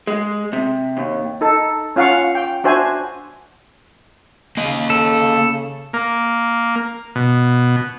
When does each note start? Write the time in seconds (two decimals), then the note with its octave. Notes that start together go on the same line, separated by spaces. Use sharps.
0.07 G#3
0.53 C3
0.97 D#2
1.41 D#4 A4
1.96 C#4 F4 F5 F#5 C#6
2.35 G5
2.64 D4 F#4 C5 E5 G#5
4.57 C#3 A#3 D#5
4.90 A4
5.93 A#3
7.16 B2